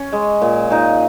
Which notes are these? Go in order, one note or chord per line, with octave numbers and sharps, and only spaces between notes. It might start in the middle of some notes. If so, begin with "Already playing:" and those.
Already playing: C#4
G#3
A#2
A#2 D#4